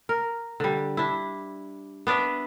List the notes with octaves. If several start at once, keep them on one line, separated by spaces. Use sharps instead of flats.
A#4
D3 G3
D4 E4
B3 D4 D5 E5